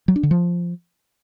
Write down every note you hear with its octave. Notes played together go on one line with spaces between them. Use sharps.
F#3
D4
D3
F3